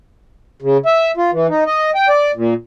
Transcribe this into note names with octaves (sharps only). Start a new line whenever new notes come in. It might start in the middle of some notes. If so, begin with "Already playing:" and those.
C#3
E5
F4
E3
D#4
D#5
G5
D5
A#2